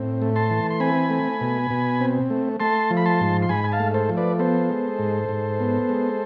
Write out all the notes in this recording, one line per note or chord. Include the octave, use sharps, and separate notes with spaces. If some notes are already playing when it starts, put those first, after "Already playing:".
Already playing: A2 C4
A3
A5 C6
E3
C6
C4 G#5 B5
A3
B2
B2
C4
A3
A3 A5 C6
F3
B5
A5 C6
G#2
C6
G#2 G#5 B5
G#5
F5 A5
A3
A4 C5
F3
B4 D5
B3 A4 C5
G#3
G#2
G#2
B3
G#3